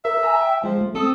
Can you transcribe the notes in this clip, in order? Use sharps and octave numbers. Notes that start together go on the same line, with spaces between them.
A#4 E5
G#5 A#5 E6
G5
F3 G#3
A3
C4 A4 D#6 E6